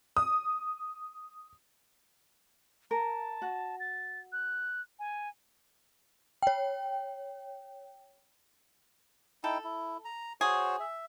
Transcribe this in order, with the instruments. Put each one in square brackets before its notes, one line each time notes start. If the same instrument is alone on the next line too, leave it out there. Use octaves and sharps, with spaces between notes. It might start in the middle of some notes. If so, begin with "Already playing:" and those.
[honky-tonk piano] D#6
[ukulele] A#4 [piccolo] A5
[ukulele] F#4
[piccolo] A6
F#6
G#5
[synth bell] C#5 G5
[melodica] D#4 E4 G5 [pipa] A4
[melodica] E4
A#5
[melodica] F#4 C5 C#5 [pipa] G#4
[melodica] E5